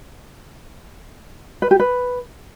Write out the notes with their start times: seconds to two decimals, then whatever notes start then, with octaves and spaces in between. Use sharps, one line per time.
1.62 B4
1.71 G4
1.80 B4